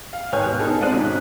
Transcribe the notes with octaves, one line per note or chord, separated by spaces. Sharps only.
F5
D#2 G#2 B4 C#5 G#5 F6
B2
B3 D#4 G#4 A4 G#5
G#3 C4 F4 D5 F#6 D#7
G#1 B2 C#4 D#4